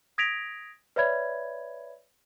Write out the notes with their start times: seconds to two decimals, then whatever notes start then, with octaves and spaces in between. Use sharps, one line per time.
0.18 D#6 G#6 A#6 B6 D7 F7
0.96 B4 C#5 D5 E5 B5 G#6